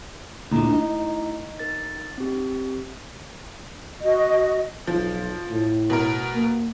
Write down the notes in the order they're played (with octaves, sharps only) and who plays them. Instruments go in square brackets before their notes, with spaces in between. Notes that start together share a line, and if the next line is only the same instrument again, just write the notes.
[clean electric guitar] D2 A#2 D3 [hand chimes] A3 E4 A#5
[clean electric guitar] D#4
[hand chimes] A#4 A6
C4 G4
[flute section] F#4 D#5
[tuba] B1 [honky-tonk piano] F3
[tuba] A2
[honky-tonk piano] B2 A#4
[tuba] A#3